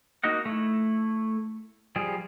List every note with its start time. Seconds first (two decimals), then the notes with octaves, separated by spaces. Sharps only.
0.24 A#3 D#4 F#4 D#5 F#5
0.46 A3 E4
1.96 F3 G3 G#4